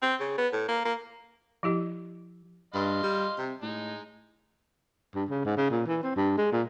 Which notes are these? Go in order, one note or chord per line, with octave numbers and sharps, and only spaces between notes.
C4
C#3
B3
A2
A#3
A#3
F3 E4 G4 D#5
G2 D#5 F5 C6
G3
C3
A2 G#3 D#4
G2
C#3
G#2
C#3
A#2
E3
C4
G2
G#3
A#2